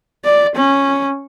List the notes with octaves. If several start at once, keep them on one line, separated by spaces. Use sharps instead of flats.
D5
C#4